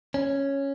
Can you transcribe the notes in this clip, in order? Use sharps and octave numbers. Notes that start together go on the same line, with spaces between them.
C#4